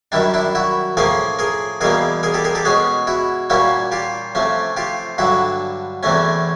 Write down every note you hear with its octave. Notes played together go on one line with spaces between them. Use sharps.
F#2 D#3 G3 D4 E4
D4 E4
E4 F#4
A2 F3 A#3 C#4 G#4 A#4
G#4 A#4
E2 B2 G3 A#3 G#4 A#4
G#4 A#4
G4 A4
G#4 A#4
G4 A4
B2 G#3 C#4 F#4 G#4
E4 F#4
A#2 G3 A#3 C#4 E4 F#4
F4 G4
C3 F3 A3 C#4
F4 G4
G2 D3 F#3 E4 F#4
E2 C3 E3 A3 C#4